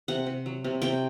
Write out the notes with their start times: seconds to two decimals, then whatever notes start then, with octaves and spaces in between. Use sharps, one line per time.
0.08 C3 F#5
0.27 C3
0.46 F#3
0.64 C3
0.82 C3 G5